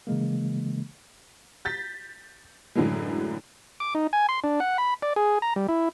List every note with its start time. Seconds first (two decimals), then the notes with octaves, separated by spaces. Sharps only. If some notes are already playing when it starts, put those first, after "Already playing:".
0.07 C#3 E3 G#3 A#3
1.65 G6 A6 B6
2.75 F#2 A2 D3 E3 F#3 G#3
3.80 D6
3.95 D#4
4.13 G#5
4.29 C6
4.44 D4
4.60 F#5
4.78 B5
5.02 D5
5.16 G#4
5.42 A#5
5.56 G3
5.69 E4